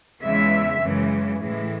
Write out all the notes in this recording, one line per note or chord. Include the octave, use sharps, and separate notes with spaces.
E2 C#3 E3 G#3 E5
F#2 C#3 E3 G#3
A2 E3 G#3